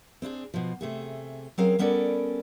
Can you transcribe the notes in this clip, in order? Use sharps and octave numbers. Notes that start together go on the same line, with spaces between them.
C4 D4 E4 G#4
B2 F3
C3 A3 G#4
F#3 C4 C#4 G#4 A#4 F5
G3 B3 C#4 A4 A#4 D5